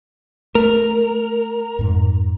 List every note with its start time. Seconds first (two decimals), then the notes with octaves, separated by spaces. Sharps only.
0.55 A3 A#4
1.79 F2 G#2